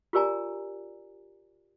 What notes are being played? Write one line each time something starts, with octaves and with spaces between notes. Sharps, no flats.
F4 G4 A#4 D5 G#5 A#5